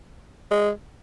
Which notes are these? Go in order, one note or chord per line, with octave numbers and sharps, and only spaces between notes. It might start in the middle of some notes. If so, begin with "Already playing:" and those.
G#3